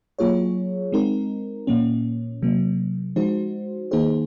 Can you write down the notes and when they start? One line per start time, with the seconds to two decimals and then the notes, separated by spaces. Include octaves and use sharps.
0.19 F#3 A#3 F4 G#4 C#5
0.92 G#3 C4 D#4 A#4
1.67 A#2 F3 A#3 C#4
2.42 C3 F#3 A#3
3.16 F3 G#3 D#4 F#4 C5
3.91 D#3 A#3 D#4 G#4 C5